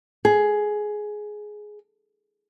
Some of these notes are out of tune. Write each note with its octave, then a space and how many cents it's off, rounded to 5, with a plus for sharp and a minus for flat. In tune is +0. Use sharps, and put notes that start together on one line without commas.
G#4 +10